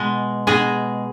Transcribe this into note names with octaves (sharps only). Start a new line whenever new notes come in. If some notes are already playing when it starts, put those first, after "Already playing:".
Already playing: B2 G#3
B2 G#3 G#4